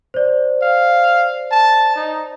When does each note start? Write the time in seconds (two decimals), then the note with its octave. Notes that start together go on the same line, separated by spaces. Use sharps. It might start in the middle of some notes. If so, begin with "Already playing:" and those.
0.14 C5 D5
0.62 F5
1.51 A5
1.96 D#4